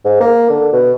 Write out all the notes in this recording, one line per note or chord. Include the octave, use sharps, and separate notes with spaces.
G#2
A#3
D3
B2